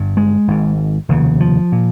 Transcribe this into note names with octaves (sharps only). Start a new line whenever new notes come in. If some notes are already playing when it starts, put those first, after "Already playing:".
Already playing: G1 G2
G#3
G#1 G#2
F1 D#2 C#3
F3
A#2